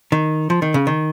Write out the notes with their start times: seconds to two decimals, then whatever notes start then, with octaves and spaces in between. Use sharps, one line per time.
0.12 D#3
0.50 F3
0.62 D#3
0.74 C#3
0.87 D#3